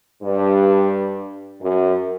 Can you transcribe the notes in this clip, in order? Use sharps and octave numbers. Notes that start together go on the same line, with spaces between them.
G2
F#2